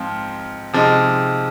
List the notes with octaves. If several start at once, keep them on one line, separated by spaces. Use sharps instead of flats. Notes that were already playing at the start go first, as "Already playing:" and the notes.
Already playing: G#2 F3 C4 F4
C3 F3 G#3 D#4